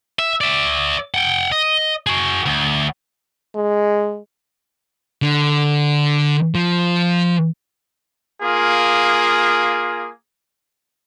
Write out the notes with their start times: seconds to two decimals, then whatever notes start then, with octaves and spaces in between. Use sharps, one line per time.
0.19 E5
0.41 D5 E5
1.14 F#5 G5
1.52 D#5
2.07 F#4 G#4
2.46 D2
3.55 G#3
5.22 D3
6.55 F3
8.42 A#3 F4 G#4